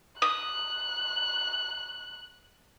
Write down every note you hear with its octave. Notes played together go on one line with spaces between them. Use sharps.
D#6 F#6